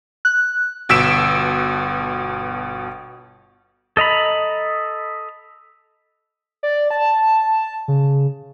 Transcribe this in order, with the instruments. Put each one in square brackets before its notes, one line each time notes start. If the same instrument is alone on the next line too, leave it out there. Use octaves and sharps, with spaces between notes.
[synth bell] F#6
[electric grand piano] G1 B2 E6 B6 D7 E7
[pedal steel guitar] A4 D#5 A#5 B5
[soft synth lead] D5
A5
C#3